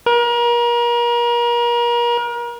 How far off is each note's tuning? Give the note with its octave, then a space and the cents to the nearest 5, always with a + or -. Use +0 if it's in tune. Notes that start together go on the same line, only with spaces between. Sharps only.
A#4 +35